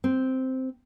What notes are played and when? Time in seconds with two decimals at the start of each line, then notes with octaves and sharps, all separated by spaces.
0.04 C4